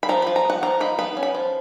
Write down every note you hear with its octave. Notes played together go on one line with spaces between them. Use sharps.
B5
F3 A#5
F3 B5
A#5
B3 F#5
F3 A#5
D#4 B5
B3 B5
C#4
B5
F3